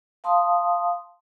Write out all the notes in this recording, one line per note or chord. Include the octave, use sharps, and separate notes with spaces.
F5 A5 C6 D#6